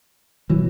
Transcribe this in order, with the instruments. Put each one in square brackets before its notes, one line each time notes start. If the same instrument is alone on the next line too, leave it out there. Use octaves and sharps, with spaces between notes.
[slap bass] B2 E3 F#3